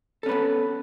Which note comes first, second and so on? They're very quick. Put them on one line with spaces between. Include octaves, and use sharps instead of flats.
A4 C#4 B4 B3